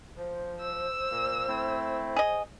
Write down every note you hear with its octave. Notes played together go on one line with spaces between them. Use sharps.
F3 C5
E6
A#2 A#3
A3 C4 E4
G#4 D#5